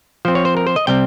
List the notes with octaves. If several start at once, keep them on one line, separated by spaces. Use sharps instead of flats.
F3 C4 C5
C#5
C5
A#4
C5
D#5
C3 G3 C4 G5